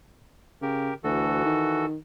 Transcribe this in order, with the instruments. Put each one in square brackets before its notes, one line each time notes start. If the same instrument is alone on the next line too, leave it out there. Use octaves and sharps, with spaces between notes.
[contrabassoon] C#3 [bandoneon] G4 A#4
[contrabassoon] D2 [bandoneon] E3 F#4 A4
[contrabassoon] D#3